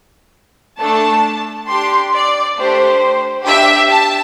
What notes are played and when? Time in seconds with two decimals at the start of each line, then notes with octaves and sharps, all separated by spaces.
0.80 A3 D4 A4 A5
1.69 D4 G4 C6
2.13 D5
2.57 A3 D4 G4 C5
3.46 D4 G4 E5
3.91 A5